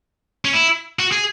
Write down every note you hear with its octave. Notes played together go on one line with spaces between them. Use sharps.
C#4
E4
F#4
G#4